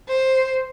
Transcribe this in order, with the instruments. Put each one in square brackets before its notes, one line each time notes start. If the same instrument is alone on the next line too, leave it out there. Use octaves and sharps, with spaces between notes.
[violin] C5